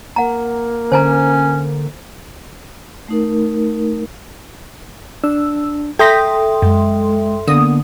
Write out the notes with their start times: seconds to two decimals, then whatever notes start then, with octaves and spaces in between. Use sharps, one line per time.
0.16 A#3 F#5 A#5
0.92 D3 C#4 C5 G#5 A#5
3.08 A3 D#4 A#4
5.24 D4 E6
5.99 A4 E5 G5 C6 D#6 G6 A#6 B6
6.62 F#2 G#3
7.48 D3 A#3 B3 D#6